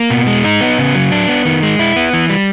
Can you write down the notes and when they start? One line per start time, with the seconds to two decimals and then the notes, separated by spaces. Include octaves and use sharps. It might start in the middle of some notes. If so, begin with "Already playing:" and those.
Already playing: A#3
0.10 B2
0.27 G#3
0.44 D#4
0.61 B3
0.78 C#3
0.95 F#3
1.12 D4
1.28 B3
1.45 D#3
1.63 G#3
1.79 E4
1.96 B3
2.13 E3
2.30 G3